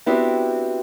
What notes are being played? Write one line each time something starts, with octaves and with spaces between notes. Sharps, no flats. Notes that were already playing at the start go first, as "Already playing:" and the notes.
B3 C4 D4 E4 F#4 G4